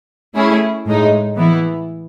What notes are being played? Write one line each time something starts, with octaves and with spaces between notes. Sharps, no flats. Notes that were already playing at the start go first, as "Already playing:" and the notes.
A3 C#4 E4 G#4
A2 G#3 D#4
E3 B3 E4